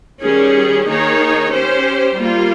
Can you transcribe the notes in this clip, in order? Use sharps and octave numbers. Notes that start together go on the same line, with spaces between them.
D#3 G3 C#4 G#4
D#3 A#3 D#4 G#4 C#5
C#4 G4 C5
G3 A#3 F4